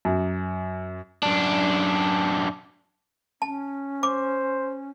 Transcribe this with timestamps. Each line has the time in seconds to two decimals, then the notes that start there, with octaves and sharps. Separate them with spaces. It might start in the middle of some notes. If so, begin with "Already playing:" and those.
0.05 F#2
1.23 F#2 D4
3.42 C#4 A5
4.03 C5 D6